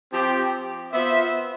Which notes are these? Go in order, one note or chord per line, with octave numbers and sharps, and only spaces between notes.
F3 C4 G4
B3 F4 C5 E5